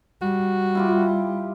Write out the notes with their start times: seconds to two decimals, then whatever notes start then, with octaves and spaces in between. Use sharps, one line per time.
0.22 G3 F#4
0.75 E4 F4 G4